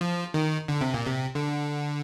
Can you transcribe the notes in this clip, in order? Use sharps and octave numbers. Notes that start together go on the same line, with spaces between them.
F3
D#3
D3
C3
A#2
C3
D3